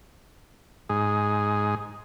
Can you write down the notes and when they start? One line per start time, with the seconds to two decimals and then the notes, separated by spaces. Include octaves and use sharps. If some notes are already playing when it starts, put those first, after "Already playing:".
0.89 G#2 G#4